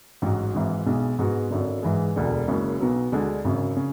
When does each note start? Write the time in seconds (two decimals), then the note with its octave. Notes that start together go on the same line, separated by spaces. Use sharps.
0.22 A1 G#2 F#3
0.54 G#1 G#2 E3
0.86 B1 B2 G#3
1.19 G#2 G#3 B3 F#4
1.50 G#1 F#2 D3
1.82 G#2 E3 G#3
2.15 E1 D2 D3 G#3
2.47 F#1 F#2 C#3 G#3
2.79 B1 B2 F#3 B3
3.12 D2 D3 G#3 D4
3.44 G#1 F#2 C#3
3.76 C#3